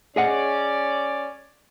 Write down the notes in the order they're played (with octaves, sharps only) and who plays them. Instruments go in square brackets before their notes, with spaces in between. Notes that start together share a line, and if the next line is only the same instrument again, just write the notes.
[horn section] C#4 D5 [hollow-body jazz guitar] G#4 D#5 F#5